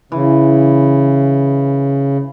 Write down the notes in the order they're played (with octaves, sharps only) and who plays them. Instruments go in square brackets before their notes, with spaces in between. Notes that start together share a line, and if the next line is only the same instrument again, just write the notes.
[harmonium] C#3 [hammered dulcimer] E3